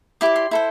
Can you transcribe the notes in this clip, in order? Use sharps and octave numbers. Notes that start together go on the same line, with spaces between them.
E4 G4 D5 D6
C6
E4 A4 C5